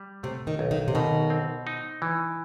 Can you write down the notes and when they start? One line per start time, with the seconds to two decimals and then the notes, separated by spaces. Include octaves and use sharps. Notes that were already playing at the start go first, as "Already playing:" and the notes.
Already playing: G3
0.23 C3 A3
0.47 D#3
0.59 B1
0.71 D#3
0.88 C3
0.95 B2 D#3
1.30 C4
1.67 D#4
2.02 E3